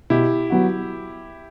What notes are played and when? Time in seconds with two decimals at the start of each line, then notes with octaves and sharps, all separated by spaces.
0.10 B2 E4 G4
0.50 F#3 B3 F#4